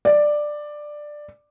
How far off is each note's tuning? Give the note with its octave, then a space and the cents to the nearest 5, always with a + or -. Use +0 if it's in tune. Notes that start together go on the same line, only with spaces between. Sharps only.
D5 +10